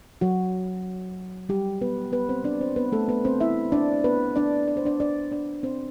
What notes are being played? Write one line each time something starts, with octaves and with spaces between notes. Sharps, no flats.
F#3 F#4
G3 G4
B3 B4
B3 B4
C4 C5
D4 D5
C4 C5
B3 B4
A3 A4
B3 B4
C4 C5
E4 E5
D4 D5
B3 B4
D4 D5
D5
C5
D4 D5
D4 D5
D4 D5
C4 C5